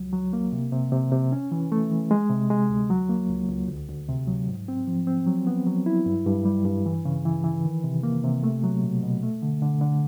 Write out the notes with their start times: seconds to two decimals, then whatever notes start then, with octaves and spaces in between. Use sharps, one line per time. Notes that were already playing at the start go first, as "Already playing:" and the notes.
Already playing: C#2 F#3
0.13 F#3
0.33 A#3
0.52 C3
0.72 C3
0.92 C3
1.12 C3
1.32 C#4
1.52 E3
1.72 A3
1.91 E3
2.11 G#3
2.30 C3
2.50 G#3
2.70 D2
2.90 F#3
3.09 A#3
3.30 C#2
3.49 C#2
3.68 D2
3.88 D2
4.08 C3
4.28 F#3
4.49 G#2
4.68 C4
4.87 F3
5.07 C4
5.26 F#3
5.47 B3
5.67 F#3
5.86 E4
6.06 G2
6.26 G2
6.45 G3
6.65 G2
6.86 E3
7.05 C#3
7.25 E3
7.44 E3
7.65 D#3
7.84 C3
8.03 A#3
8.24 C3
8.43 A3
8.64 F#3
8.83 B2
9.03 B2
9.23 A3
9.42 D3
9.62 D3
9.81 D3